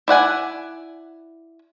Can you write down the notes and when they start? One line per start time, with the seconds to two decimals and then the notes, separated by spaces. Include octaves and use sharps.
0.08 E4 D5 F#5 G#5